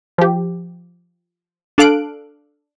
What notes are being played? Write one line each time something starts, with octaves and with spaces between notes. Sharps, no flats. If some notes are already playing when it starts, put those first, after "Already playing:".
F3 G4
D4 A4 F5 F#6 D7